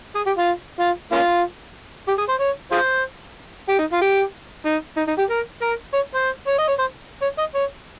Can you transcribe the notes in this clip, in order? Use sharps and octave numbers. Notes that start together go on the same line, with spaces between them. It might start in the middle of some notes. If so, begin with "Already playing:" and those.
G#4
G4
F4
F4
A#3 C#4 F4
G4
G#4
C5
C#5
F4 G#4 C5
G4
D#4
F4
G4
D#4
D#4
D#4
G4
A#4
A#4
C#5
C5
C#5
D#5
C#5
C5
C#5
D#5
C#5